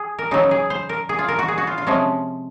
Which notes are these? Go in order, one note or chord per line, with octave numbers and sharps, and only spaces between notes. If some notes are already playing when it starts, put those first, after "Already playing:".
Already playing: G#4
A#4
C#3 F#3 D#4
G#4
C5
A#4
G#4
F4
A#4
F#4
G#4
F#4
F4
F4
C3 F3 G#3 C#4